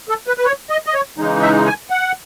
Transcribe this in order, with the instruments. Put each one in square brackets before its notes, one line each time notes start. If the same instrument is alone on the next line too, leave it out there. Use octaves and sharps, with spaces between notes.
[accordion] A4
B4
B4
C#5
D#5
D#5
C#5
C#3 E3 G#3 D#4
E5
G#5
F#5